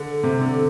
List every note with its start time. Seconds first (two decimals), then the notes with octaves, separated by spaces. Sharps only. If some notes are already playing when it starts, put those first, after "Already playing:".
Already playing: D3
0.23 C3
0.41 D3